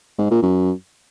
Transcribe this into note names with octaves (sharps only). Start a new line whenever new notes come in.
G#2
A#2
F#2